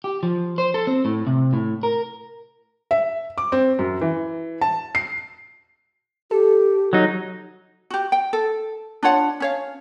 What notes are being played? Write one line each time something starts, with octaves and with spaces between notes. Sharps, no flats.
G4
F3
C5
A4
C4
A2
C3
A2
A#4
E5
D6
C4
F#2
E3
A5
C7
G4 A4
F#3 D#4
F#4 G4
G5
A4
D4 F4 C#5 F#5
C#4 C#5 F5